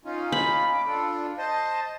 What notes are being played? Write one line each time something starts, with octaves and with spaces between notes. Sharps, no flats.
C#4 D#4 F4
B5
D6
D4 F4 A4
C5 D#5 A5